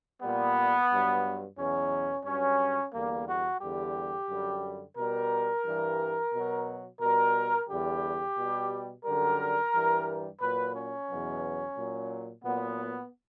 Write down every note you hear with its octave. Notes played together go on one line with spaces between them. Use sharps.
A#2 G3 B3
G2 F#3
E2 B2 F#3 C#4
G2 F#3 C#4
E2 D3 G3 A#3
F#4
E2 D3 G3 G4
F#2 D3 G3
B2 G3 A#4
G2 E3 G3
B2 F#3
B2 G3 A#4
E2 D3 G3 G4
B2 G3
F#2 D3 G3 A#4
G2 E3 G3
A#2 F#3 B4
C#4
E2 B2 F#3
A#2 F#3
A#2 F#3 B3